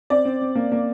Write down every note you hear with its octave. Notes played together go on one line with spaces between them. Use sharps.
C4 D5
C4
C4
A#3
A#3